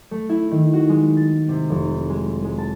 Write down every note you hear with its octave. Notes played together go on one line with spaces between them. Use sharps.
A3
E4
D#3
F#4
G#3
A6
C3
F1
G#3
G#3
A5